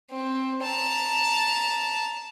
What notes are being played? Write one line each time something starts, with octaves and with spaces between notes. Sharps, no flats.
C4
A5 A#5